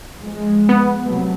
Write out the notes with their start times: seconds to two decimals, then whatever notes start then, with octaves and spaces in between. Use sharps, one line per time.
0.20 F3 G#3
0.69 B3
1.05 C3 F#3 A3